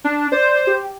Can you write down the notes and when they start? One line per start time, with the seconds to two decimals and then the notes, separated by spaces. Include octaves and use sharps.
0.04 D4
0.32 C5 D5
0.67 G4